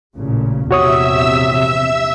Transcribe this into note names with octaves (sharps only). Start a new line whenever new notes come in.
A1 A#2 C#3
A#1 E2 C3 F#4 C#5 E5 D#6 E6